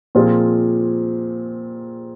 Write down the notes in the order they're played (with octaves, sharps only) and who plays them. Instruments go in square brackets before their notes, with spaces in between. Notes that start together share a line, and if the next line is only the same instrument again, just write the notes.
[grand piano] A#2 F3 C4 F4 G#4